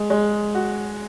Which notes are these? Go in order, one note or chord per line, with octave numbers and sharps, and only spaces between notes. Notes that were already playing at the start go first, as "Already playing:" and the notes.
Already playing: G#3
G#3
F#4